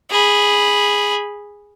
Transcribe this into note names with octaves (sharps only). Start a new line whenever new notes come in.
G#4 B5